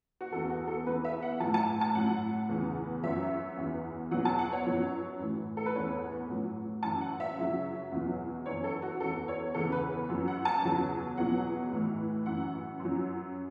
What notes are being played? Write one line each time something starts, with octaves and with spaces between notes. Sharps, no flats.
F#4
E2 E3 A4
F#4
A4
E2 E3 B4
E5
F#5
A2 F#3 A5
A5
A5
A2 F#3 F#5
E2 C#3 E3
F#2 F#3 E5
E2 E3
E2 B2 F#3 F#5
A5
F#5
C#5
F#2 F#3
A2 E3
A4
B4
E2 E3 C#5
A2 F#3
F#2 E3 A5
F#5
E5
F#2 C#3 F#3
E2 B2 F#3
F#2 E3 C#5
A4
F#4
E2 E3 A4
C#5
E2 C#3 E3 A4
B4
F#2 F#3
F#5
A5
E2 C#3 F#3
E2 B2 F#3 F#5
A2 E3
F#2 E3 F#5
F#2 F#3